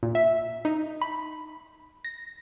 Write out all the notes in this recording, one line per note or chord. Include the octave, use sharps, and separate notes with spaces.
A#2
E5
D#4
B5
A#6